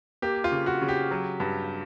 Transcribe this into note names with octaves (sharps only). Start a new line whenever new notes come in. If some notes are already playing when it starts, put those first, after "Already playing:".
A#3 G4
F4
C#3
F#4
C#3
G4
F#3
G2